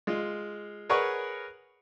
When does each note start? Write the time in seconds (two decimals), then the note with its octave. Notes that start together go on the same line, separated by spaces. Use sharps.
0.07 G#3 F4
0.89 G#4 A#4 B4 C#5 F#5 C#6